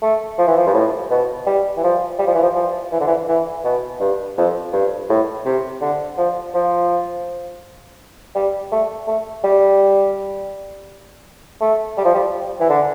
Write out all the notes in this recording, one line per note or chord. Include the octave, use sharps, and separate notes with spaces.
A3
F3
E3
F3
G2
A2
B2
G3
E3
F3
G3
F3
E3
F3
F3
E3
D3
E3
E3
B2
G2
F2
G2
A2
C3
D3
F3
F3
G3
A3
A3
G3
A3
G3
F3
G3
E3
D3